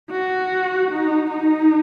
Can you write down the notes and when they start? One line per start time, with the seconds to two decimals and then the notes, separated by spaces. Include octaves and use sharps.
0.11 F#4
0.91 D#4
1.31 D#4